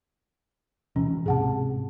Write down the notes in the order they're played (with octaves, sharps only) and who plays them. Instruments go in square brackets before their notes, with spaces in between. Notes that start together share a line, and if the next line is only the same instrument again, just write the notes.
[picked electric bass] D2 B2 E3 [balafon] C#4
[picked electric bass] G#2 C3 [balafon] G#4 F#5 A5